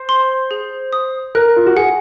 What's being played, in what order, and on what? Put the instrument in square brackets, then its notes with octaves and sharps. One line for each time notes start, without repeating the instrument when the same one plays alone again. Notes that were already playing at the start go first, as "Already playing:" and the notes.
Already playing: [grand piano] C5
[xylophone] C6
G#4
D#6
[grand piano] A#4 [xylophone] F#6
[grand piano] F4
F#4
[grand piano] G#4 [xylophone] F#5